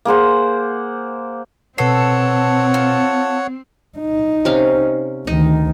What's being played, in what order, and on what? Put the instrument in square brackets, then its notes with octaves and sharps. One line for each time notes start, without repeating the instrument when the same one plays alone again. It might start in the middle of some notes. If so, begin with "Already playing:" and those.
[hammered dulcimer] A#3 G#4 C5 F#5
[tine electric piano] B2 B4 C7 [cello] C4 [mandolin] A4 [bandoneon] C#5 F#5
[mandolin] F4 A4
[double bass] D#4
[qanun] C3 C#4 F5
[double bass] D2 D#3 [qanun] D#4